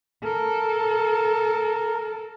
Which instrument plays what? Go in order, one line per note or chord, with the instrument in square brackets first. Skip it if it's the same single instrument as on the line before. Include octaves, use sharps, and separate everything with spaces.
[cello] A4 [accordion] A#4